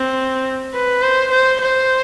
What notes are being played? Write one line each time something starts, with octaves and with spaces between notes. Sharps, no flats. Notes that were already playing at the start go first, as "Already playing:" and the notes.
Already playing: C4
B4
C5
C5
C5